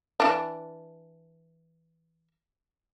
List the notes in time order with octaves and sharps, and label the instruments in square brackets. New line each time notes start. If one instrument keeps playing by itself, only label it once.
[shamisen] E3 D4